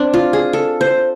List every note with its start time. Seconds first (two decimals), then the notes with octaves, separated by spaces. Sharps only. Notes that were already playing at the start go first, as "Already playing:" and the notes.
Already playing: C4 D4
0.14 F4
0.33 G#4
0.53 A4
0.81 C5